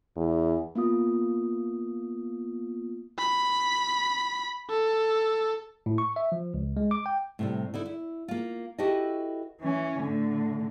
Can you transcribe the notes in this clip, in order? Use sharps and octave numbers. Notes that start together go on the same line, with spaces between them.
E2
A#3 B3 F4 D#6
B5
A4
A2
C#6
E5
F3
C#2
G#3
D6
G5
A2 C3 G3
D3 D#4 E4
E4
A#3 F4
E4 F#4 G4 A4 B4 D#5
E3 C#4
A2 D3